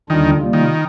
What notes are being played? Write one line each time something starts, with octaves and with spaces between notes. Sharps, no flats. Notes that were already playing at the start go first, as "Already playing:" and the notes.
D#2 D3 D#3 G3 D4 F4
C3 G3 A#3 F4
D#3